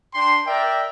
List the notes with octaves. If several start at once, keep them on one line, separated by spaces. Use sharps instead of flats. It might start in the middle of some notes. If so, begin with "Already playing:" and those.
D4 G5 C6
A#4 D5 E5 G5